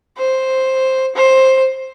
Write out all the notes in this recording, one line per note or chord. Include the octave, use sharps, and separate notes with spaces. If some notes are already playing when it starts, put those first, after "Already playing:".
C5
C5